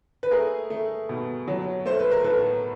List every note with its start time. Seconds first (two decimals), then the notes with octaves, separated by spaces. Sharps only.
0.23 B4
0.31 A3 G#4 A#4
0.70 A3
1.09 B2
1.48 F#3
1.86 A3 C5
1.99 B4
2.11 A#4
2.24 A2 A4 B4